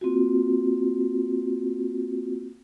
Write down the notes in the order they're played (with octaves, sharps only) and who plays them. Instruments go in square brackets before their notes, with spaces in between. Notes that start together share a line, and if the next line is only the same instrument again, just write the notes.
[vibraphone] A#3 C4 F4 F#4